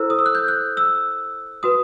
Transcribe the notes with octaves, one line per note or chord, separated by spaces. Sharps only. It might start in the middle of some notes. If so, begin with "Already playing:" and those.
Already playing: E4 A4 C5 E6
D#6
E6
F#6
G6
F#6
E6
F#4 B4 D#6